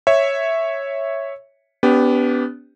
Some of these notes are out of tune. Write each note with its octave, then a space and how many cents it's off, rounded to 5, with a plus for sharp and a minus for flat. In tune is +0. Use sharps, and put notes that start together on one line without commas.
C#5 -5 E5 +0
B3 +10 D4 -40 G4 +0